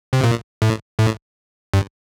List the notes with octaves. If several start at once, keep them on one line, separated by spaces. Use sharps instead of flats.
C3
A#2
A2
A2
G2